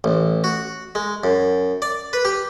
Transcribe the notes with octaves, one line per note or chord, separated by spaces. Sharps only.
A1
F#4
G#3
F#2
D5
B4
G4